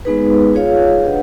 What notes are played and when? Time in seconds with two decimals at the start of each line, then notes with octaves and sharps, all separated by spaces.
0.05 G#3 B3 D#4 G#4 B4
0.54 F4 G#4 C#5 F5
1.03 D4 G4 B4 D#5 F#5